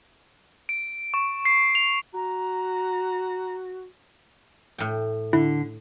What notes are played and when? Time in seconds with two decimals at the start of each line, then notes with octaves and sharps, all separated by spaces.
0.69 D7
1.14 C#6
1.45 C7
1.75 F7
2.14 F#4 A#5
4.78 A2 G5
5.33 D3 E4